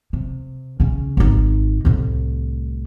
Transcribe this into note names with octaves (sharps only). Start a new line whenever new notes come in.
C3
C#3 C#4
G#1 D#4
C2 A2